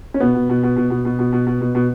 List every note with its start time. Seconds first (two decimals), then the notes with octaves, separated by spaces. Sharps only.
0.14 C#4
0.20 B2 B3
0.35 B2
0.49 B2
0.63 B2
0.77 B2
0.90 B2
1.05 B2
1.19 B2
1.33 B2
1.47 B2
1.61 B2
1.75 B2